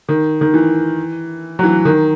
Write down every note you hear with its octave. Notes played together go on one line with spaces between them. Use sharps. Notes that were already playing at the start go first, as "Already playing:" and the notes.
D#3
D#3
E3
F#3
E3
D#3